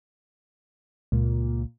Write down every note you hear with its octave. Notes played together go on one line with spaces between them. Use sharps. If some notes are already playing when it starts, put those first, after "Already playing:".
C#2 A#2